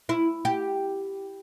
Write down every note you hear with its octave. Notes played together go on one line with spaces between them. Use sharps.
E4
G4